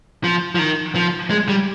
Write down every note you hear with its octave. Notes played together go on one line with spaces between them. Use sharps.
F3
F3
D#3
F3
G#3
G3